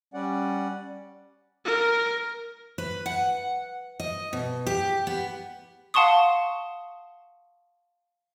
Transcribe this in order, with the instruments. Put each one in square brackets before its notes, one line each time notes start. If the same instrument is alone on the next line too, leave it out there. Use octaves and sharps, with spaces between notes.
[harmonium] G3 C#4 D5 F#5
[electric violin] A#4
[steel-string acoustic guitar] B4
F#5
D#5
B2
G4
B3
[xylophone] F5 F#5 A5 C6 C#6 D#6